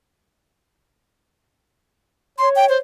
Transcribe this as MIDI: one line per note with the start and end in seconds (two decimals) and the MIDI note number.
2.38 2.81 73
2.38 2.49 84
2.56 2.66 79
2.69 2.78 72